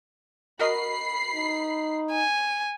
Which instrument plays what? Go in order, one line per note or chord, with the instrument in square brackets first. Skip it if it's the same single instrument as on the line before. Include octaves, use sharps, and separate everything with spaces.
[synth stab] F#4 A#4 D#5 [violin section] B5 C7
[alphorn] D#4
[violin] G#5